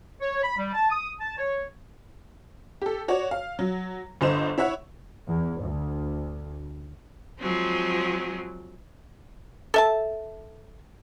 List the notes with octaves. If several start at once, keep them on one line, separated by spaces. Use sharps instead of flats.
C#5
B5
G3
A5
D#6
A5
C#5
G4 A4
F#4 C#5 D5
F5
F#3
G1 D3 C5 D#5 E7
E4 C#5 E5 F#5
E2
D2
F3 F#3 G#3 C4
A4 E5 A5